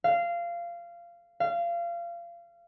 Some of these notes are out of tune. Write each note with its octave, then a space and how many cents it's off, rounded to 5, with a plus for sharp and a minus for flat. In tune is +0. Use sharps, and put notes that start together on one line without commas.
F5 -20
F5 -25